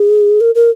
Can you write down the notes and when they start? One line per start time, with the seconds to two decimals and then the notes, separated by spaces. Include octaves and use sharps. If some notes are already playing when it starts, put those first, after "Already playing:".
Already playing: G#4
0.41 A#4
0.55 A#4